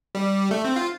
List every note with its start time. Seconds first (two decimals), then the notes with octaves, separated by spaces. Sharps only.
0.15 G3
0.51 A3
0.65 C4
0.76 F4